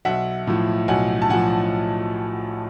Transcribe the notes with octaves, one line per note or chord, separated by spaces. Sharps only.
B1 E5 F#5
A2 F3
B1 F#5 G#5
A5
A2 F3 F#5 G#5